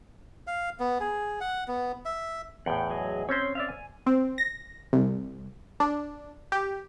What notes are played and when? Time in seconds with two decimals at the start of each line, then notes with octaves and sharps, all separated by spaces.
0.47 F5
0.80 B3
1.00 G#4
1.41 F#5
1.68 B3
2.05 E5
2.66 E2 A2 F#5 G5
2.90 F#3 G#4 D#5
3.29 C4 C#4 C5 C#5 C6
3.55 D5 E5 F5
3.69 G#5
4.06 C4
4.38 A#6
4.93 C2
5.80 D4
6.52 G4